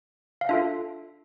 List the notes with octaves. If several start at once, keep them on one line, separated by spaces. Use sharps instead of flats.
F5
D4 F4 A4 E5